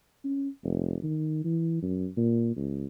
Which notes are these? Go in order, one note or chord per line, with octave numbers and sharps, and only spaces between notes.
C#4
F1
D#3
E3
F#2
A#2
C#2